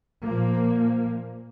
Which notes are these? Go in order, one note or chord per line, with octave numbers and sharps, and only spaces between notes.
A#2 F3 A#3